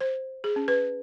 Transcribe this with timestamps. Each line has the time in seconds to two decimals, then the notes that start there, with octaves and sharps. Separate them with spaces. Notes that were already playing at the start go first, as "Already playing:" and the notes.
0.01 C5
0.44 G#4
0.56 C#4
0.68 B4